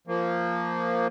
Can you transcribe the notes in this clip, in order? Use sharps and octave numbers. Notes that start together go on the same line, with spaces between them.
F3 A#3